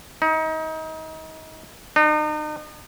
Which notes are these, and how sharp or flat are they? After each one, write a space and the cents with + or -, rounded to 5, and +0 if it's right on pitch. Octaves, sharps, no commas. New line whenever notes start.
D#4 +30
D#4 -40